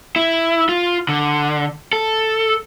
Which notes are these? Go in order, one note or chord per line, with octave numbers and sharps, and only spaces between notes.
E4
F4
D3
A4